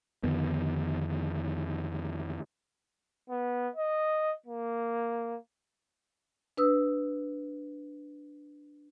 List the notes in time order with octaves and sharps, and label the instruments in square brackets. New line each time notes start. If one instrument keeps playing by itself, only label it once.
[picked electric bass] F2 D3 D#3 B3
[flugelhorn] B3
D#5
A#3
[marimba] D4 B4 D#6 E6